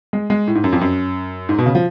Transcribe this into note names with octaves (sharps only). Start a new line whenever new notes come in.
G#3
G#3
A2
G#2
F#2
F2
F#2
G#2
B2
C#3
F3